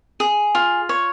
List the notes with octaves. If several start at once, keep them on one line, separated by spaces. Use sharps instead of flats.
G#4
F4
C#5